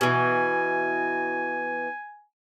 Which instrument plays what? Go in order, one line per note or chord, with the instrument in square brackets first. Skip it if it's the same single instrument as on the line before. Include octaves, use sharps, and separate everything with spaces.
[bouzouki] B2 E3 [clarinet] G#5